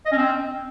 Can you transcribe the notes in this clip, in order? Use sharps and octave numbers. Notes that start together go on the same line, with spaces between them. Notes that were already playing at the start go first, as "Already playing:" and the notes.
D#5
C#4
C4